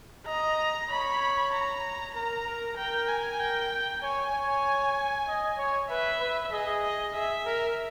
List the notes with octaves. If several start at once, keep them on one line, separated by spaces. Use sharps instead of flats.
D#5 A#5
C#5 B5
A#5
A#4 A#5
A#4
A#4 G5
G#5
G5
C#5 G#5
C#5
D#5
C#5
B4 E5
B4
G#4 D#5
D#5
G#4 E5
A#4